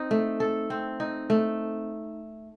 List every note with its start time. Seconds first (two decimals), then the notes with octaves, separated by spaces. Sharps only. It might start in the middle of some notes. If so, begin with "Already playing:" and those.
Already playing: C4 D#4
0.11 A3
0.40 A4
0.70 C4
1.00 D#4
1.30 A3